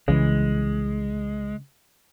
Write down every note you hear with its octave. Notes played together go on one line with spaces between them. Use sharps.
C2 C#3 E3 G#3